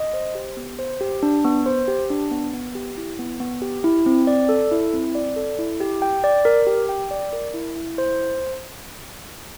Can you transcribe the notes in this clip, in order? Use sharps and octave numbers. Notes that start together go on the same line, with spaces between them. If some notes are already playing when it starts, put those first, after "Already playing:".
Already playing: D#5
C5
G4
B3
C5
G4
D4
B3
C5
G4
D4
B3
B3
G4
E4
B3
B3
G4
E4
C4
D5
A4
E4
C4
D5
A4
E4
G4
G5
D5
A#4
G4
G5
D5
A#4
E4
E4
C5